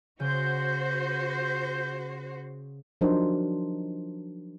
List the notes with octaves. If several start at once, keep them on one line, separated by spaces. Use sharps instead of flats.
C#3 F#4 C5 G6
F3 F#3 D4 D#4 A#4 C5